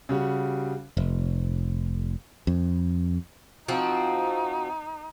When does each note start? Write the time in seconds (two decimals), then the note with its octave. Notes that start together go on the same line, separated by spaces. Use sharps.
0.09 C#3 G3 F#4
0.97 F1
2.47 F2
3.68 F3 C4 D#4 F#4